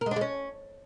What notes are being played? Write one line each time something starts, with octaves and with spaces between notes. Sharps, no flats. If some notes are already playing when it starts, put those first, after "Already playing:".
A#4
G#3
D4
G#3
C#4